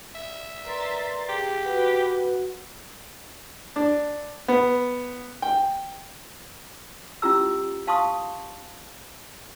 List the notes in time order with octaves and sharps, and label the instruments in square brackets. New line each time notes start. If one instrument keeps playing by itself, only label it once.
[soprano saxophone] E5
[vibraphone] A#4 B4 D5 [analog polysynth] A#5 C6 A6
[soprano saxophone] G4 [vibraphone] G#4
[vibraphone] F#4 F#5 [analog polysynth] B4
[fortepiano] D4
B3
G5
[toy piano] C#4 E4 F4 G4 A#5 E6
F5 A5 C6 C#6 D#6